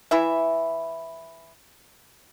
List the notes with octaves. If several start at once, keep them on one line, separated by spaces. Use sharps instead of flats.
E3 E4 E5